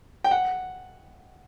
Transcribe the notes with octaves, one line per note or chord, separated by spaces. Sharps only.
G5
F#5